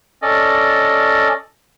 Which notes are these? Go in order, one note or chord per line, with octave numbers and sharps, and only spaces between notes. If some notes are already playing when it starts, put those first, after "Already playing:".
C#4 A4 D5 D#5